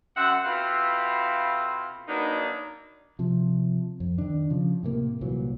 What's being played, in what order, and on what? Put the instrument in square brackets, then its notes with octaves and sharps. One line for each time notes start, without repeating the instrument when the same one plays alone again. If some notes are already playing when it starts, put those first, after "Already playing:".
[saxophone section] F#2 C4 E5 F#5
B2 C4 E4 F4 A4 F5
F#3 A#3 B3 D4 D#4
[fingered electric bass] C3 F3
F2
D#3 D4
C#3 F3
A2 C3 A#3
C2 A#2 E3 F#3